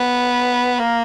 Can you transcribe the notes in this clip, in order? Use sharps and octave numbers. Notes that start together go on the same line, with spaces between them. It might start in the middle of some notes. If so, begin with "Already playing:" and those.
Already playing: B3
A#3